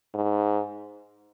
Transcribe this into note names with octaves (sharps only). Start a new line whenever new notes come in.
G#2